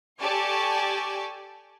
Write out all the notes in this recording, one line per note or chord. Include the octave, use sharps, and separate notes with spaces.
G4 A4 D5 G#5 A5 C#6